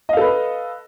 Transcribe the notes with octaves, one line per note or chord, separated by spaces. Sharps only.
A4 B4 D#5 F5